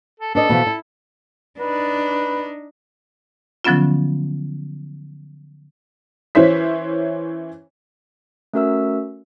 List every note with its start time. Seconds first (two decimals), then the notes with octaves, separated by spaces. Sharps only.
0.20 A4
0.35 D4 A4 B4 D#5
0.49 B2 E3 F3
0.66 E4
1.60 D4 D#4 B4
3.64 D3 F3 F#3 B3 C#4 F4
6.35 E3 C#4 E4 C5 B6
8.53 A3 C#4 F#4 A#4 E5 E6